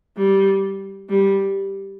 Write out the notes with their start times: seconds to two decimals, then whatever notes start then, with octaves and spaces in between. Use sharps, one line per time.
0.17 G3
1.09 G3